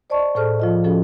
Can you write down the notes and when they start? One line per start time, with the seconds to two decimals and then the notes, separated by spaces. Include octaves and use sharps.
0.10 C5 D5 D#5 A5 C#6
0.35 A2 G#4 A4 C5 A5 F6
0.60 F3 F4 D#5
0.84 F3 C#4 F#4 G#4 A4